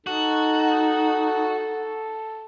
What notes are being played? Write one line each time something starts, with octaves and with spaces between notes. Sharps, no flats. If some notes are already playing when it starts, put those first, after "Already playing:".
D#4 F#4 A4